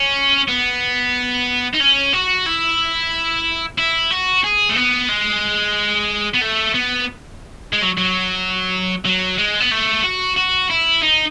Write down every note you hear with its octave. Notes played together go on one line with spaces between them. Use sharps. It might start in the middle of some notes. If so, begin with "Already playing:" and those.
Already playing: C#4
B3
D#4
C#4
F#4
E4
E4
F#4
G#4
A3
B3
G#3
B3
A3
B3
G#3
F#3
F#3
F#3
G#3
B3
A3
F#4
F#4
E4
D#4